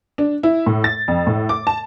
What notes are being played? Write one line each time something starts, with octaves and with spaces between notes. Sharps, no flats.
D4
E4
A2
A6
F2
A2
D6
A5